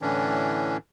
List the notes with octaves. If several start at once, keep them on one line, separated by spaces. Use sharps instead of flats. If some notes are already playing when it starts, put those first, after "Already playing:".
A2 D3 E3 C#4 D4